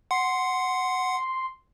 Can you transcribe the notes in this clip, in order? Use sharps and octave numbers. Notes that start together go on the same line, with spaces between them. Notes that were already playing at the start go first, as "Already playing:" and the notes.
F#5 C6